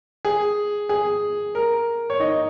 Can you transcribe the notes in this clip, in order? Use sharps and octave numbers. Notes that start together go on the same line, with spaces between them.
G#4
G#4
A#4
C#5
D#4 D#5